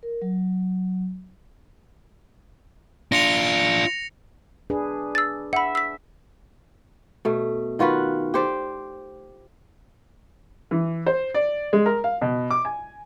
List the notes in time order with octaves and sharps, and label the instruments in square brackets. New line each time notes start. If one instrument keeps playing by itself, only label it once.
[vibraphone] A#4
F#3
[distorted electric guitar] D4 F4 [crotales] A#6 C#7 F7
[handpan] D4 G#4 B4
[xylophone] E6 A6
[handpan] E5 [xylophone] F#5 B5
[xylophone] E6 B6
[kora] B2 A3
D#3 F4 F#4 B4
G4 C5 D5
[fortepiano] E3
C5
D5
G#3
A#4
F5
B2
D6
G#5